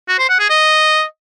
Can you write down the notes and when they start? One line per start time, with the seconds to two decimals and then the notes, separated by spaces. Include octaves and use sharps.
0.09 F#4
0.19 C5
0.29 F#5
0.40 G#4
0.50 D#5